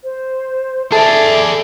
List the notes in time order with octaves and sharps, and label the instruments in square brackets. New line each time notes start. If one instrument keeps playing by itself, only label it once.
[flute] C5
[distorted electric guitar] G#4 D5 [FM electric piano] A4 [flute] E5 [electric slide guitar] A5